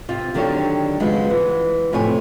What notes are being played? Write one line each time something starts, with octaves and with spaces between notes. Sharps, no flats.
C3 F4
D3 D#3 F#3 D4 G4 C#5
C#3 F3 F#3 G#3 B3
E3
F2 A2 C3 C#5 G#5